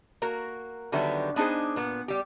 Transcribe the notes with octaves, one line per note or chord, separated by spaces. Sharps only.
A#3 F#4 A#4
D3 D#3 F#3 G3 B3 E5
B3 D4 D#4 G#4 C5
A#2 B3
G3 G4